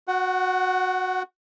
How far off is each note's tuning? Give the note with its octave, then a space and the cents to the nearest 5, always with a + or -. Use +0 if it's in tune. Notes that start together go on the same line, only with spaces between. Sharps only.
F#4 -15 F#5 +20